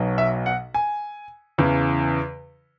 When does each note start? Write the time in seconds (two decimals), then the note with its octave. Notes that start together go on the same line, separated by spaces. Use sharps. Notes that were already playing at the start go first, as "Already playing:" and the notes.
Already playing: B1 B2 F#3
0.18 E5
0.46 F#5
0.74 G#5
1.58 E2 C#3 E3